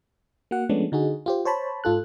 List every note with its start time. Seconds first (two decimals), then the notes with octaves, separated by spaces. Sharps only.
0.51 A#3 F#4 F#5
0.69 F3 G#3 A3 B3 C#4 D4
0.92 D3 D#4 F#4 G#4
1.26 F4 G4 C5
1.45 C5 C#5 A5 B5
1.84 G#2 F4 A4 F#6